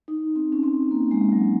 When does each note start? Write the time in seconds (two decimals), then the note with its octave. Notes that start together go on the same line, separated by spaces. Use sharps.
0.08 D#4
0.36 C4
0.52 C#4
0.63 C4
0.91 A#3
1.11 G#3
1.32 F#3